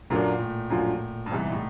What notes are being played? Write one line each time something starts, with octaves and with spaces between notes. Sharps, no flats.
F#2 A#2 D3 F#3 A#3 D4
A2
F#2 D3 F3
G2
E2 G#2 C3 E3 G3
A2